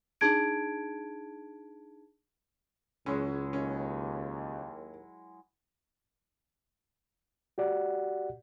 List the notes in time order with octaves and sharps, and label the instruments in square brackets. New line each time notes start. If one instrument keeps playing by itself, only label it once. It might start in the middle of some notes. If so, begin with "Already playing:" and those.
[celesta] D4 D#4 G#4 A5 G#6 D7
[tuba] C#2 [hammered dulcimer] F#3 G#3 E4 [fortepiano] C#4
[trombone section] D#2 [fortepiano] C#4
[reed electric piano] F#4 G4 D5 F#5